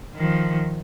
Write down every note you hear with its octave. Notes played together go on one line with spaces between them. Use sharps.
D#3 F3